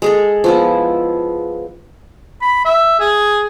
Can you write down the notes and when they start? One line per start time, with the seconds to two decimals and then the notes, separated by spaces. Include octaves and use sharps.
0.02 G#3 G#4 A4
0.44 F3 B3 E4
2.42 B5
2.65 E5
3.00 G#4